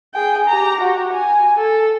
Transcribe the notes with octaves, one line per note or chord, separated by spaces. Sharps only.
G#4 G5
G4 A#5
F#4 G4
G#5
A4